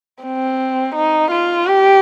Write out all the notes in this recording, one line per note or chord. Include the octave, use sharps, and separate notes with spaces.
C4
D#4
F4
G4